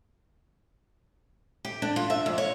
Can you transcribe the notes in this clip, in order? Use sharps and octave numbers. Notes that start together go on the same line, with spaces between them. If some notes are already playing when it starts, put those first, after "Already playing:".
G4
D4
F4
E5
F2
C#5